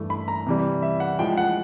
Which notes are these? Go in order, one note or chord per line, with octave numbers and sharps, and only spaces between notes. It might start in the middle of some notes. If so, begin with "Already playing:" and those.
Already playing: G2 E3 A3
B5
A#5
C3 E3 G3
E5
F#5
A2 F3 G#3 G5
F#5